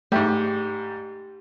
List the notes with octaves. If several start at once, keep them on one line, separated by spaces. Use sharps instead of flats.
G#2 G3 A3 G4